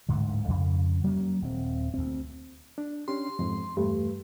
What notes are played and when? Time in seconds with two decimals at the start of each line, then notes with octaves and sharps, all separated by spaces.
0.09 D1 G#2 D3
0.48 F2 C#3
1.04 F#3 A#3 C#4
1.42 D#1 A#2 C4
1.94 D2 C4
2.78 D4
3.08 C#4 D4 G4 C6
3.39 F2 G#2
3.77 E2 G2 A3